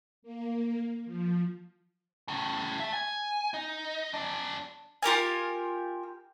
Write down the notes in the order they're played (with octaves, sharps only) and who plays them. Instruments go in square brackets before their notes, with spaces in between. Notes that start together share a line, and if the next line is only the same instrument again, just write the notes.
[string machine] A#3
F3
[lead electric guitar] A2 C#3
E5 A5
G#5
D#4
F#2 D4
[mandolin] F4 G4 A#4 G#5